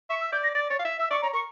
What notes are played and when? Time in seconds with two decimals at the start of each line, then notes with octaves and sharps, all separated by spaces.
0.10 E5 C#6
0.21 E6
0.32 D5 G6
0.43 A#6
0.55 D5 A6
0.70 C#5 A6
0.79 F5
0.85 E5
0.99 E5 E6
1.11 D5 C#6
1.22 C#5 A#5
1.33 A#4 C#6